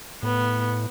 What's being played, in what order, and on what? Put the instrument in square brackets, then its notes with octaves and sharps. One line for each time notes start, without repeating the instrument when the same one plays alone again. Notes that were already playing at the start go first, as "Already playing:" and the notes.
[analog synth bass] A2 [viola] B3